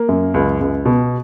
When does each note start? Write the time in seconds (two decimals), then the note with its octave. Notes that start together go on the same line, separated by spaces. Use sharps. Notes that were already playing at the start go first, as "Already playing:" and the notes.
Already playing: A#3
0.09 F#2
0.34 C#2
0.61 C#2
0.85 B2